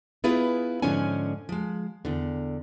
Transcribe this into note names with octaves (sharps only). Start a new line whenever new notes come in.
B3 E4 F4 G#4 B4
G#2 D3 F3 C#4 G#5
F3 G#3
E2 D3